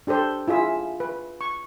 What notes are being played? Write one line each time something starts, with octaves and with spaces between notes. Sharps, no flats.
D4 G4 A4 C5
E4 F4 G#4 E5
B4
C#6